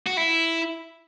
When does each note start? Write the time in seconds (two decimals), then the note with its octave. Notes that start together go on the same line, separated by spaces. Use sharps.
0.07 F#4
0.17 E4